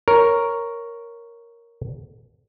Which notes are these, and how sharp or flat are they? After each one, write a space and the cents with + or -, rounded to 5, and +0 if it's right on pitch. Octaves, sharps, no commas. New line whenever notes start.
A#4 +0 C#5 +0